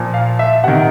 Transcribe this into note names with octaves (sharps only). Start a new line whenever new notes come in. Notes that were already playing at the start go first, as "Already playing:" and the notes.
Already playing: A#2 F3
F5
E5
C3 D#3 F#5